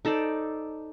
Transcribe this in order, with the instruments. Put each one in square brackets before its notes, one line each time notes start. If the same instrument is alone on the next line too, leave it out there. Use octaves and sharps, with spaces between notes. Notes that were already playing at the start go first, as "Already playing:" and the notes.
[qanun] D#4 A4 C5 D5